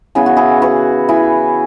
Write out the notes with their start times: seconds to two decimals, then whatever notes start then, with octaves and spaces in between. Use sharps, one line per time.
0.15 C#3 E3 B3 G#4
0.26 F#4
0.37 E4 G#4
0.62 F#4 B4
1.09 E4 G#4